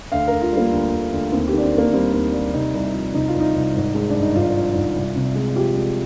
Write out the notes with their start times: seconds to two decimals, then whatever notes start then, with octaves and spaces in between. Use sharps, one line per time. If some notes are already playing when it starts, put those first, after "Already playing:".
0.12 D2 F5
0.27 D2 A#4
0.42 F4
0.52 G3
0.57 A#3
0.72 D2
0.92 D2
1.12 D2
1.32 D#2 C4
1.48 G4
1.53 D#3 D4
1.63 C4
1.73 D#2
1.78 A#3
1.93 G3 C4
2.13 D#2
2.33 G3
2.53 C3 D#4
2.74 C2
2.94 F3
3.14 C3 D#4
3.28 F4
3.34 C2
3.40 D#4
3.54 C2
3.75 G#1
3.95 G#3
4.09 D4
4.14 G2
4.22 D#4
4.35 G#1 F4
4.55 F3
4.75 G#1
4.96 C2
5.15 C3
5.35 G#3
5.56 F3 G4
5.76 G#3